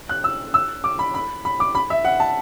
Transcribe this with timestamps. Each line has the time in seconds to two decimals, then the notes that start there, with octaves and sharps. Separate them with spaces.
0.09 F#6
0.24 E6
0.54 E6
0.84 D6
0.99 B5
1.14 B5
1.45 B5
1.60 D6
1.75 B5
1.90 E5
2.05 F#5
2.20 A5